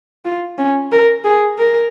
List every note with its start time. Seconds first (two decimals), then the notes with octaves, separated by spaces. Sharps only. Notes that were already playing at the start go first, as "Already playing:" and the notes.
0.25 F4
0.58 C#4
0.92 A#4
1.24 G#4
1.58 A#4